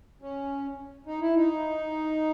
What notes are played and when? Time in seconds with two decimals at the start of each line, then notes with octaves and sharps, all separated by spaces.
0.22 C#4
1.06 D#4
1.21 E4
1.35 D#4